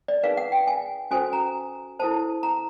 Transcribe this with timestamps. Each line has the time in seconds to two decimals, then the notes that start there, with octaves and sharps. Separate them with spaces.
0.08 D5
0.23 D#4 G#4 B4 F5
0.37 F#5
0.52 G5
0.67 G#5
1.11 C#4 F#4 A4 C5 G#5
1.33 A#5
1.99 E4 A4 C5 A5
2.43 A#5